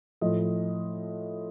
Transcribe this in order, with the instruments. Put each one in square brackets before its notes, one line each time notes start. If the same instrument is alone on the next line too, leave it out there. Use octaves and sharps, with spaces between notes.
[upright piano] A2 F3 D#5